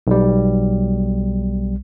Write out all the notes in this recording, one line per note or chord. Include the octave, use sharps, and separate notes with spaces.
B1 G3